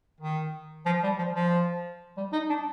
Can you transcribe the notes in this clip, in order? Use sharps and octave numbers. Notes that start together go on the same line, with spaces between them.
D#3
F3
G3
F3
F3
G3
D#4
D4